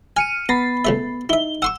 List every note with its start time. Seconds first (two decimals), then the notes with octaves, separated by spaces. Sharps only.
0.17 G#5 F6 C#7 D#7
0.49 B3 A#5 B5 A6 C7
0.85 C#2 A3 E5
1.29 D#4 E4 E5 G7
1.62 F#5 C6 C#6 E6